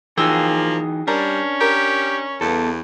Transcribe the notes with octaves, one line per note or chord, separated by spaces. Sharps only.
E3 F3 A#3 D#4 F#4 G#4 G5 E6
G3 C#4 D4 A#4
G4 A#4
E2 B3 A4